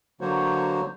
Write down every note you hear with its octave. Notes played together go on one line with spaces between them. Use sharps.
D3 F#3 A#3 F#4 C5 C#5